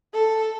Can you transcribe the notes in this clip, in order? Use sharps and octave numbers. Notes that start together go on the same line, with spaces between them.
A4